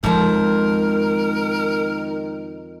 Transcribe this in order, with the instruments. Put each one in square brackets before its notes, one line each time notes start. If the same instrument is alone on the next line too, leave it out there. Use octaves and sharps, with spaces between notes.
[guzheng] F2 A#5 [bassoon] D#3 [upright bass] G#3 [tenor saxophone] A#4